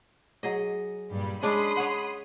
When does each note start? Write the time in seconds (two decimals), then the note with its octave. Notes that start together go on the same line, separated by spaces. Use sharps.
0.43 F#3 G#4 D#5
1.12 G2 A#2 G3
1.43 G#3 C#4 D4 B5 C6 D#6
1.77 C#5 F#5